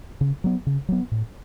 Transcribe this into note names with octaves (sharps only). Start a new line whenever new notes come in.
C#3
F#3 B3
C#3
F#3 B3
A2